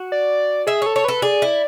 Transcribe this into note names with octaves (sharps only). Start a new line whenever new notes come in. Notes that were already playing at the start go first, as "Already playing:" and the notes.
Already playing: F#4
D5
G#4 E5
A4 C#5
C#5
A4 B4
G#4 D5
E4